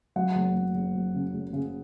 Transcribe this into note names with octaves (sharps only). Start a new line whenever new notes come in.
F#3 F#5
F#1
F#1
F#1
F#3
C#3
F#1
C#3